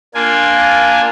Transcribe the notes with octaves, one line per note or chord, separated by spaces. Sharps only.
A#3 D4 F4 G#5